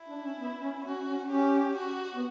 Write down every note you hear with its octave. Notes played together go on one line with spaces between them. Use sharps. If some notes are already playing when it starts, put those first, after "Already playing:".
Already playing: E4
D4
C#4
B3
C#4
C#4 F#4
C#4
C#4 G4
F#4
B3